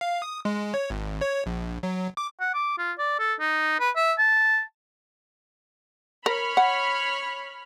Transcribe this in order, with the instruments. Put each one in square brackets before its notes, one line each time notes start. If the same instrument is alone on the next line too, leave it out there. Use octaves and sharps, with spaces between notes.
[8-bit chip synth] F5
D#6
G#3
C#5
G#1
C#5
A#1
F#3
D6
[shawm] F#5
D6
F4
D5
A4
D#4
B4
E5
A5
[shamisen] A#4 [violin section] C#5 B5 F6
[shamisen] F#5